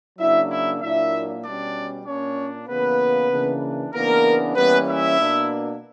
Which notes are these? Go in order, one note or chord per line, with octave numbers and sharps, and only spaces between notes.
C#3 F#3 A#3 D4 E4 E5
E4 E5
A#2 F#3 A#3 D4 E4 E5
B2 G3 C#4 D4 D5
A#2 A#3 C#4 D4 C#5
C#3 E3 A#3 B3 B4
C#3 E3 A#3 D4
C#3 E3 A#3 B3 D4 A#4
E3 G3 A#3 B3 C#4 B4
E4 E5
B2 A#3 D4